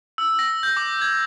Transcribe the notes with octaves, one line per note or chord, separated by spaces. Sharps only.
E6
A#6
G6
D6
G#6